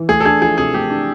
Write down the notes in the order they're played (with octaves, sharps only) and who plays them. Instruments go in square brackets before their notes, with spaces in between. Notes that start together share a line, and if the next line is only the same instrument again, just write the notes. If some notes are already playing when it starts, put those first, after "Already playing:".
Already playing: [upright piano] E3
[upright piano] A3 [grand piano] G#4
[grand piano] A4
[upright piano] D4 [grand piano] G#4
[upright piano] F3 [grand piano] G#4
[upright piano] C3 [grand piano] G#4
[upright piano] A3 [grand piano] G4
[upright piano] D4